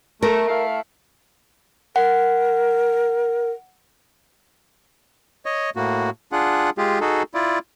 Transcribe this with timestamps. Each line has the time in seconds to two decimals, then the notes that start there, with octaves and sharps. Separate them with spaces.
0.23 A3 A#4
0.48 A3 E4 F5
1.96 A#4 F#5
5.45 C#5 D#5
5.76 A2 A#3 F#4
6.32 D4 F4 G#4 F#5
6.78 G#3 F4 G4 G#4
7.01 D#4 F#4 G#4 A4
7.34 E4 F4 D5